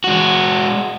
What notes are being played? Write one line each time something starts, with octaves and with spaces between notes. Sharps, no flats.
G#3 F#4